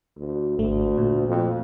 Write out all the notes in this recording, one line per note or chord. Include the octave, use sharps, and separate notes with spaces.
D2
G#1 D2 A3
A#2
F2